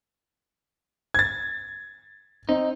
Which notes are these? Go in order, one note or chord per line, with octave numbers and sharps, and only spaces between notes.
G#6 A6
C4 D#4